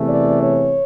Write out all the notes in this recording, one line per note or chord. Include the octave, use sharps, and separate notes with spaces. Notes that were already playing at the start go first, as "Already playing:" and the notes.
Already playing: E2 C3 E3 A3
D5
C#5